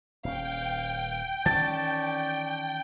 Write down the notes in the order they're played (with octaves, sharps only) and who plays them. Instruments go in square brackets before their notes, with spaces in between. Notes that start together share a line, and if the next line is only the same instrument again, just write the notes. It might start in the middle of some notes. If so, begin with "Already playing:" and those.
[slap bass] D#1 C#4 [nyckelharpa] F5 [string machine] G5
[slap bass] D#3 E3 [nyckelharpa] C#4 D5 [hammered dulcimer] A5